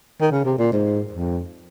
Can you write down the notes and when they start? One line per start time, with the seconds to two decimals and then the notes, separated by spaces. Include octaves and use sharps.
0.21 D#3
0.31 C#3
0.45 C3
0.58 A#2
0.72 G#2
1.13 F2